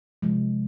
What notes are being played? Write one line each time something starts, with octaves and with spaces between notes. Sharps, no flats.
C3 F3 G#3